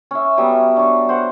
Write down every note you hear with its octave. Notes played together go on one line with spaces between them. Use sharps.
C#4 E5
F#3 G3 B3 E5
D4 C#5
C5 F#5